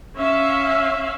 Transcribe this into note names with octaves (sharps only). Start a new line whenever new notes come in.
C#4 E5 F5